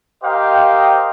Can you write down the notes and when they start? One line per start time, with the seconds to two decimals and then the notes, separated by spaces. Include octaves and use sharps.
0.23 G4 A#4 C5 D#5 F5 G5